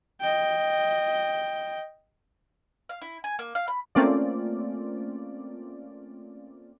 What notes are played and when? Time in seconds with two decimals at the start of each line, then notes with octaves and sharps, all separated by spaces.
0.21 D#5 G5
2.89 F5
3.02 E4
3.24 G#5
3.39 A#3
3.55 F5
3.68 B5
3.95 A3 A#3 C4 C#4 F4 D5